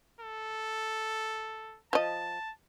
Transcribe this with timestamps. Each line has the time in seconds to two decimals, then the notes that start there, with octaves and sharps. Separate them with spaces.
0.21 A4
1.93 F3 D#5 A5